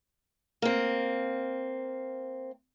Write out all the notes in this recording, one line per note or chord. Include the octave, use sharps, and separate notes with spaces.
A#3 C4